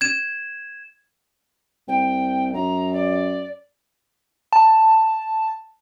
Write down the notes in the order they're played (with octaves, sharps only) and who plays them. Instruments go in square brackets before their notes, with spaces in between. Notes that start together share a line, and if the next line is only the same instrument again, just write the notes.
[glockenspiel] G#6 E7
[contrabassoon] C2 [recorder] G5
[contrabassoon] F#2 [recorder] A#5
[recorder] D5
[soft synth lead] A5